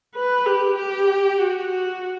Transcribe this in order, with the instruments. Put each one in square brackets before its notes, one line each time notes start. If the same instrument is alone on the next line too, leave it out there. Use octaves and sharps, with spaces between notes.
[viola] B4
G4
G4
F#4
F#4